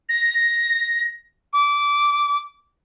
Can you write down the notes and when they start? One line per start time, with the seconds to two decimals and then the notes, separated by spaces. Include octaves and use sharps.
0.09 A#6
1.53 D6